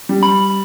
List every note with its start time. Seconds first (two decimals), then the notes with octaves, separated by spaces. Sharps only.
0.09 G3
0.23 B5